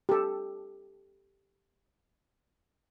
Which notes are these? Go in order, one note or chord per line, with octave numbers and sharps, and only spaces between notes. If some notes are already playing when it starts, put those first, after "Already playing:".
G4 A4